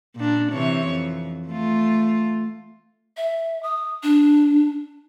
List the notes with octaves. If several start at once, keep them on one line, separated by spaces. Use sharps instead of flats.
A#2 D4
C3 E3 C#5
F2
A3 F4
E5
D#6
D4